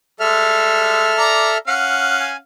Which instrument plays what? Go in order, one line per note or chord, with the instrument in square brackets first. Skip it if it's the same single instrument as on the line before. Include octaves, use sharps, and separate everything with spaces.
[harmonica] G3 G#3 [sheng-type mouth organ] A4 E5 F6
[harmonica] D5 A#5
C#4 F5 F#5
[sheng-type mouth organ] G#5